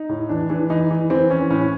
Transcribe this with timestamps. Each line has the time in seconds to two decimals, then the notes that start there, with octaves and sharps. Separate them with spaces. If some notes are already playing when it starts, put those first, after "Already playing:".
Already playing: D#4
0.09 A2
0.29 E3 D4
0.50 E3 D4
0.70 E3 D#4
0.91 E3
1.10 E3 C4
1.30 E3 C#4
1.50 A2 C#4